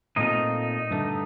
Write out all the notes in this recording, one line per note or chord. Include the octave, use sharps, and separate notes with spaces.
A#2 A3 C4 D#4 F4 D#5
G2 D3 A3